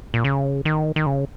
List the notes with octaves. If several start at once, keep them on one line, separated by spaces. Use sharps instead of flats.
A#2
C#3
D#3
D#3
C#3